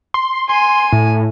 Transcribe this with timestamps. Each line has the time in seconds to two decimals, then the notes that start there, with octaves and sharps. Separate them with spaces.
0.14 C6
0.49 G#5 C6
0.92 A2